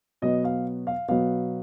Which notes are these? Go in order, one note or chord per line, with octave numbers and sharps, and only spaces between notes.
B2 F#3 B3 D#5
F5
F5
B2 F#3 B3 F5